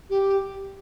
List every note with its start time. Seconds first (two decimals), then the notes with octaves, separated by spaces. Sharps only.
0.10 G4